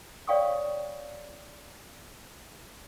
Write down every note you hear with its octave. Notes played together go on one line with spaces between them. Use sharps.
C#5 D5 F5 G5 C#6 D#6